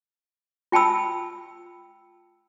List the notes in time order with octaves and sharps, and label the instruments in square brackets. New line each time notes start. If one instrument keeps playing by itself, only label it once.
[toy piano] F4 G5 A5 B5 E6